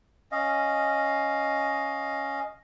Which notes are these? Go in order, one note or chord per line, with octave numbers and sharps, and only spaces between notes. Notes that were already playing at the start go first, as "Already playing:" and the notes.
C#4 D#5 F5